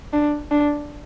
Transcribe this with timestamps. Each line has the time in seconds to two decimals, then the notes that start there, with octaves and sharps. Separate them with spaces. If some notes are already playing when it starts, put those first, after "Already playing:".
0.13 D4
0.51 D4